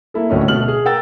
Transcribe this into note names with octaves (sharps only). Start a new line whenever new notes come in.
A#3 E4 A4
D1 D2 A2 C#4 D4 D#5
B2 A3 F6 F#7
G#4
A#4 F#5 G5 E6 A6